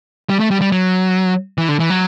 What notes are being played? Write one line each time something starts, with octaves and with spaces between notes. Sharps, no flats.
G3
A3
G3
G3
F#3
E3
D3
E3
F#3